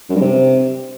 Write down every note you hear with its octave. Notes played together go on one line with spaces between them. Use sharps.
F#2
G2
C3